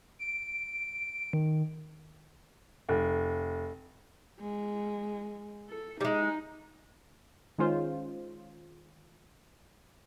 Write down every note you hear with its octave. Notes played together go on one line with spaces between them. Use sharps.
D7
D#3
F1
G#3
A4
G3 G#3 D#4
D#3 G#3 C#4 F4 C5